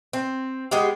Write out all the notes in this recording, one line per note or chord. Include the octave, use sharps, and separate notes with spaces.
C4
G#3 B3 G4